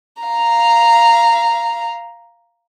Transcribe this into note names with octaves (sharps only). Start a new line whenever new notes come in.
F5 A#5